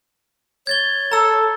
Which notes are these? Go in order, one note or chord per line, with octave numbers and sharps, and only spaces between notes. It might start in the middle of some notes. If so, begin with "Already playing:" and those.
C#5 G#6 A6 G7
A4 A#5 E6